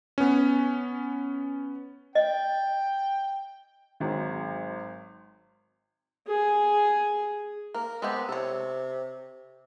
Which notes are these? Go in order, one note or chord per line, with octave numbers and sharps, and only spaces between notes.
B3 C#4
D#5 G5
G#1 G#2 F#3
G#4
A#3 A#4
G#3 B3 C4 G4
C3 A4 C#5